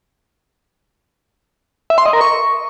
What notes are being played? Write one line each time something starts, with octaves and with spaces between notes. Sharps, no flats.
E5
C6
D#5
A#4
C#6